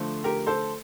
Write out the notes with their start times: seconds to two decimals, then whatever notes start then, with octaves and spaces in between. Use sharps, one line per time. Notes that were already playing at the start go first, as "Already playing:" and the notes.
Already playing: D3 F3 A3 A4 C5
0.24 G4 A#4
0.47 A4 C5